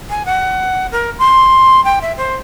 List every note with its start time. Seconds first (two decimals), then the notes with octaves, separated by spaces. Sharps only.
0.10 G#5
0.25 F#5
0.91 A#4
1.19 C6
1.84 G5
2.01 E5
2.17 C5